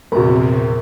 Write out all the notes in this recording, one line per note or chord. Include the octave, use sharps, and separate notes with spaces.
A#1 E2 C3 F#4 A#4 B5